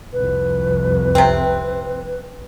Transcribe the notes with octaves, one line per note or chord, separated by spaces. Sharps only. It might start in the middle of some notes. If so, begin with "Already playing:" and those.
C2 F2 B4
C3 C4